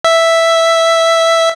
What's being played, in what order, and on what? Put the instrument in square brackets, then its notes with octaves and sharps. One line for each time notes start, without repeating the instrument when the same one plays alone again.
[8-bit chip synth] E5